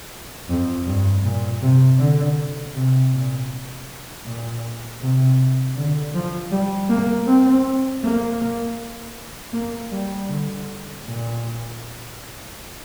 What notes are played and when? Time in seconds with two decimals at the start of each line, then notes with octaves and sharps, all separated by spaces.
0.49 F2
0.87 G2
1.24 A#2
1.62 C3
1.99 D3
2.75 C3
3.13 A#2
4.25 A#2
5.01 C3
5.76 D3
6.14 F3
6.52 G3
6.89 A#3
7.27 C4
8.03 A#3
9.53 A#3
9.92 G3
10.29 D3
11.04 A#2